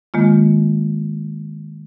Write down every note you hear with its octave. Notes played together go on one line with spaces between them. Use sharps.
D#3 G#3 A#3 F4